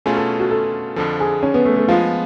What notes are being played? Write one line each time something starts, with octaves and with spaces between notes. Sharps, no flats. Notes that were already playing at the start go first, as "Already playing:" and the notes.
B2 A3 C#4 F4 G#4
A4
F#4
A4
F2 D3 F3 A4
G#4
C#4
B3
A3
A3
F3 G#3 B3 F4